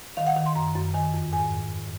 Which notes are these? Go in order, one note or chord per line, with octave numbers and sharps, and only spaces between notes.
D#3 F5
F#5
D#3
C6
F#2 A#5
F#2
D#3 G#5
F2
G#2 G#5